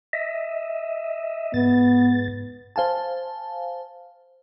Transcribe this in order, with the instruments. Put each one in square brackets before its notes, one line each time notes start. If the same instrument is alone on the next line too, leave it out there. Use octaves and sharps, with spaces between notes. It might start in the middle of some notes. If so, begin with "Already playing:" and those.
[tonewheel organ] D#5 E5
[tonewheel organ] G#2 A6 [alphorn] B3
[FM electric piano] C5 F5 G#5 A5